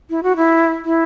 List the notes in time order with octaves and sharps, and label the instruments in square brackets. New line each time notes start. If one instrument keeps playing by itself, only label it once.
[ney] E4
F#4
E4
E4